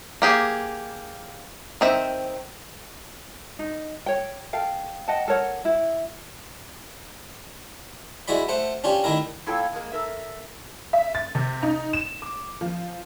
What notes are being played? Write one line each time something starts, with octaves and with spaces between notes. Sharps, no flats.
A#3 G4 G#4
D#3 C4 E5
D#4
C#5 G5
A4 F5 G5
D#5 F#5 G5 A5
A4 A#4 C#5 F#5
E4
G#3 E4 F#4 D5 B5
A3 C5 F#5
C#4 D4 F4 G4
D#3 A3 E4 A#4
A#3 E4 F4 A4 C#5 G5
G#3 A#3
A4 A#4 E5
E5
A6
C3
D#4
E7
D6
F3